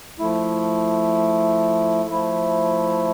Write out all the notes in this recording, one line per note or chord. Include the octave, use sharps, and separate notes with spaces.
F3 A3 E4
F3 A3 E4